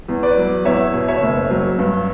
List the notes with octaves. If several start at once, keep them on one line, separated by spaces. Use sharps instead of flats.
E2
B4 D5
F#3
E2 C#5 E5
B2
C#5 E5
F#1
F#3
G2